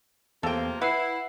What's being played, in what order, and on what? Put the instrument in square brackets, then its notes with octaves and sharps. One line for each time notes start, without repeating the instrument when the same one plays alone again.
[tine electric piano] E2 [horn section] C3 F3 A#3 [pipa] A4 G5
[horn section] E4 [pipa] B4 [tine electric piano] F#5 E6 C7